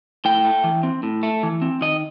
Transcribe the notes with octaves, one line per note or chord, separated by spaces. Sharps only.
A2 G5
A3
E3
C4
A2
A3
E3
C4
D#3 D#5